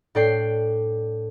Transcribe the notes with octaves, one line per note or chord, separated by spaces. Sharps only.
A2 D4 A4 D5 G5 C7